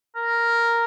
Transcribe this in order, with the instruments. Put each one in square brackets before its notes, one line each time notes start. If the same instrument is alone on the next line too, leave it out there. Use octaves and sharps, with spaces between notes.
[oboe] A#4